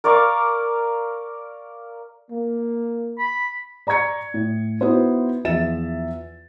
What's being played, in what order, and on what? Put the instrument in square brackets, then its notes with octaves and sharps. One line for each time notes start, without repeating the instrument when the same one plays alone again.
[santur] A#4 D5 F5 C#6
[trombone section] A#3
[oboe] B5
[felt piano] D5 A#5 C#6 G#6 C#7
A2
B3 D#4 E4 F#4 C5
E2 F3 F4 E5 A6 E7